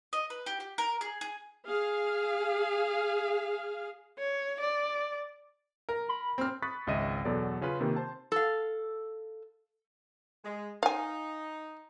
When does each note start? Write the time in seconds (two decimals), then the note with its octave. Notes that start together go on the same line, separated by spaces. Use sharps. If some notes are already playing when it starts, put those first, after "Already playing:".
0.13 D#5
0.30 B4
0.46 G4
0.60 G4
0.78 A#4
1.01 G#4
1.21 G#4
1.66 G#4 F5
4.19 C#5
4.60 D5
5.89 A#4
6.09 B5
6.38 C4 F6
6.62 B5 C#6 D#6 F#6 A6 B6
6.87 G#1 C#2 C#3 D#5 E5 D#7
7.25 E2 B2 F#3 A4 D5
7.61 C#3 C#4 F4 B4
7.80 C3 D#3 A#3
7.96 C5 A5
8.32 A4 F5
10.44 G#3
10.83 D#4 F5 G#5